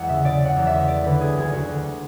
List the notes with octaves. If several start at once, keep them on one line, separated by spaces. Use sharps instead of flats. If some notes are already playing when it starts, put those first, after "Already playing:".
Already playing: E2 G#3 F#5
C#3 E5
C#3 D5
C#3 F#5
E2
E5
C#3
A3 D5
D3 B4
D2 G#4
D2 G#4
D2 F#4
D2